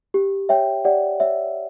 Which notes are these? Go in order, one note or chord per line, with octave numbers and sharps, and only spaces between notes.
G4
C#5 E5 G5
G4 D5 F#5
C#5 E5